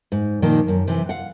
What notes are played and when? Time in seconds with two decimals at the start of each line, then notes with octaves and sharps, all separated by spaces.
0.12 G#2
0.42 A#2 D#3 F3 A#3
0.68 F#2
0.87 C3 E3
1.09 F5 F#5